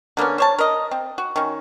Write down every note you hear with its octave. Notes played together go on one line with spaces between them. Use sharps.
D3 A#3 B3 C#4
C5 C#5 A5
A#4 D#5
C4
F#4
D#3 C#4